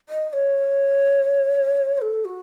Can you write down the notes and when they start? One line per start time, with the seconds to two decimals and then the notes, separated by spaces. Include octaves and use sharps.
0.09 D#5
0.30 D#5
0.33 C#5
1.98 C5
2.02 A4
2.25 F#4